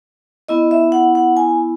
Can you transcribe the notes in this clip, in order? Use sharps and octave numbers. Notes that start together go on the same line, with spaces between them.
B3 E4 D#5
E5
F#5
F#5
G#5